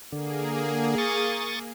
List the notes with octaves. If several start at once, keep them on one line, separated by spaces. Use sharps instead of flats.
D3 A#3 G#4
C#6 D#6 A6